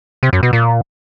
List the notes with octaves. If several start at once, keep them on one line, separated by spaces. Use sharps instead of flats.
C3
F#2
B2
A#2